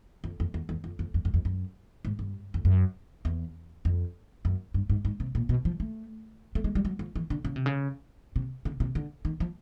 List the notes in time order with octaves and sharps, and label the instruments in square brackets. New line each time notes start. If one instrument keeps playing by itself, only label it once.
[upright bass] F2
F2
E2
E2
F2
F2
F2
F#2
F2
F#2
G#2
G2
F2
F#2
E2
F2
F#2
G2
G#2
G#2
C3
A#2
B2
F3
A3
A3
G#3
G3
F#3
F3
E3
D3
C#3
C3
C#3
C3
C#3
C3
D3
D#3
F3